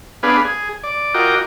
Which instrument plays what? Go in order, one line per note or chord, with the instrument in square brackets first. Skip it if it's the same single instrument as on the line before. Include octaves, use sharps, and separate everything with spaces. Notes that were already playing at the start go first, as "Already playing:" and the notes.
[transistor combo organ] B3 D4 G#4 B4 F5
G#4
D5
F4 F#4 A#4 D#5 G5 D6